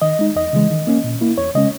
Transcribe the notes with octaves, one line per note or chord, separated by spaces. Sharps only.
D#3 D#5
G#3 D#4
E2 D#5
C#3 E3 G#3
D#3
A#3 C#4
A#2
A#3 E4
E2 C#5
C#3 G#3 C#4 D#5